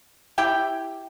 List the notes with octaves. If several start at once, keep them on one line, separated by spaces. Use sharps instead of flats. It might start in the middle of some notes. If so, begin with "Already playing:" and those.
E4 G4 G5